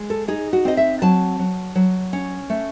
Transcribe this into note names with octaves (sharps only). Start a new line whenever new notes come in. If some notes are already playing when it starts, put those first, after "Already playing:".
Already playing: G#3
A4
D#4 G#4
F#4
C4 D#5
E5
F#3 A5
F#3
F#3
C#4
A3